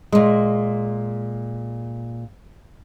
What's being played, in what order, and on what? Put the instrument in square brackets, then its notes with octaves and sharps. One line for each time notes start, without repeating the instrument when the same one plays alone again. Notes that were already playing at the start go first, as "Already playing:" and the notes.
[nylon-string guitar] A#2 G#3